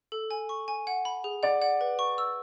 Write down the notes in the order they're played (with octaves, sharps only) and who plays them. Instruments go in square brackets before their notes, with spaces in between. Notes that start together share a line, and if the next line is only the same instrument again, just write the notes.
[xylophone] A4
G#5
C#6
G#5
F#5
B5
G#4
[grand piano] D5 [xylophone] F#5
[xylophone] F#5
B4
C#6
E6